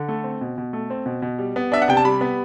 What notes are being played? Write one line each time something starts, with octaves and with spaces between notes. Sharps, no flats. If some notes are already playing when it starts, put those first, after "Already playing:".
Already playing: D3
A3
C4
B2
B2
A3
C4
B2
B2
G3
B3
D4 E5
F#5
C3 G5
A5
G3 B5
B3